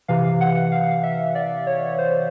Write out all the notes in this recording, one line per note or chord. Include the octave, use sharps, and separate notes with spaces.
C3 E3 F5
F#5
F5
E5
D5
C#5
C5